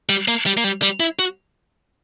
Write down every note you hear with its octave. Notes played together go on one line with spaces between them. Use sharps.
G3
A#3
G3
A#3
G3
G3
E4
F#4